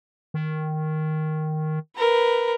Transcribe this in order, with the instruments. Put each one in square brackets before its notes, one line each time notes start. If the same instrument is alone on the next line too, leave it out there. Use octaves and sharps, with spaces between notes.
[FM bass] D#3
[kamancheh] A#4 B4